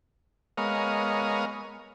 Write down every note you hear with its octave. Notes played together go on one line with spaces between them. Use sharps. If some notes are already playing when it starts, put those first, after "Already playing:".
G#3 B3 A#4 C#5 D#5 F5